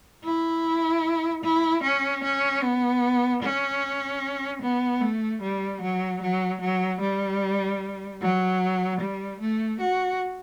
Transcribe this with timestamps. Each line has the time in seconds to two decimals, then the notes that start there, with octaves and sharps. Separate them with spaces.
0.24 E4
1.44 E4
1.83 C#4
2.24 C#4
2.63 B3
3.43 C#4
4.62 B3
5.01 A3
5.42 G3
5.81 F#3
6.22 F#3
6.61 F#3
7.01 G3
8.21 F#3
9.00 G3
9.40 A3
9.80 F#4